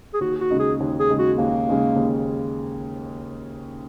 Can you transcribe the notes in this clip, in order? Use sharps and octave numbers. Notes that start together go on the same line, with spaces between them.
G#4
D#2 F#4
F#4
C#3 G#3 D#4
G#4
D#2
G#4
C#3 G#3 D#4
F#4
D#2 A#3
C#3 G#3 D#4
D#2